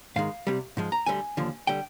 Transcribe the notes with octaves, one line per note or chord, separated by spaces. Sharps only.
G#2 D#3 G#3 F5
C2 C3 G3
G#2 F3 G#3
A#5
D2 D3 G3 G#5
D#2 D3 F3
D3 G3 G5